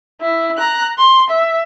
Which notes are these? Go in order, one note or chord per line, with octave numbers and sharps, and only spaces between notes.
E4
A#5 F#6
C6
E5